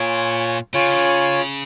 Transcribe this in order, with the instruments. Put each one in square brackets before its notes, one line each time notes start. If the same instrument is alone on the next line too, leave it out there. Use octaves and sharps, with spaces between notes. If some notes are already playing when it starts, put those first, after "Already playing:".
Already playing: [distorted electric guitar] A#2 [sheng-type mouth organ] F4 C#5 G#5
[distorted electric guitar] C#3 [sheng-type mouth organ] F4 C#5 G#5